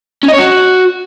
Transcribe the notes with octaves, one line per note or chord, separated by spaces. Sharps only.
C#4
D#5
C#5
F#4